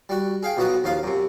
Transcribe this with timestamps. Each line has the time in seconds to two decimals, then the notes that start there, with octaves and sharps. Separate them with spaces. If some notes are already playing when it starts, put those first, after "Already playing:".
0.09 G3 F#4
0.43 G#4 F5 G5
0.57 B1 B2 F3 F#3 D#5 F#5
0.84 D#2 F3 F4 F5
1.03 F#2 C3